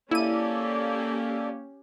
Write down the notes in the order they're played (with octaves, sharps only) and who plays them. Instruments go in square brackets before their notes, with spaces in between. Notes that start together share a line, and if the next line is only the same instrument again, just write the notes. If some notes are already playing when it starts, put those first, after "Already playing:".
[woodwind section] A#3 [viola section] C#4 G4 [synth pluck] E4 D#7 [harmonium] A4 D5